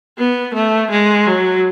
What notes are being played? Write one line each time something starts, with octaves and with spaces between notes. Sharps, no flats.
B3
A3
G#3
F#3